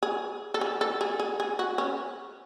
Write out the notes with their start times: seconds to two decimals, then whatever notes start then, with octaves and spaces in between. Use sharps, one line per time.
0.03 G#4
0.54 A4
0.61 G#4
0.81 A4
1.01 G#4
1.20 G#4
1.40 G#4
1.59 F#4
1.78 C#4